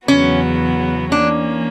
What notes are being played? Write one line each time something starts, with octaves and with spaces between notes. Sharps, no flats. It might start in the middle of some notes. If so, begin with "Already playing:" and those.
E2 C#3 F#3 B3 C#4 F#4
E3 A#3 C#4 D4